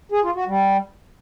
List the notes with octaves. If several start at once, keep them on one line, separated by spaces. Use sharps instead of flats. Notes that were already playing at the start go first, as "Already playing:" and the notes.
G#4
F4
F#4
G3